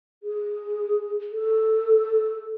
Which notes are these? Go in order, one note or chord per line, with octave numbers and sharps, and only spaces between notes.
G#4
A4